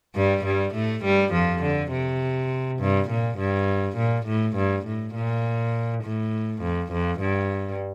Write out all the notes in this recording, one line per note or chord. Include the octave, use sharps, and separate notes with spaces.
G2 G3
G2 G3
A2 A3
G2 G3
F2 F3
D3
C3
G2
A#2
G2
A#2
A2
G2
A2
A#2
A2
F2
F2
G2